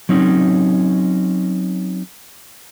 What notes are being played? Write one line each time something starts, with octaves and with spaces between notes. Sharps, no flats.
F#3 C4 C#4 D#4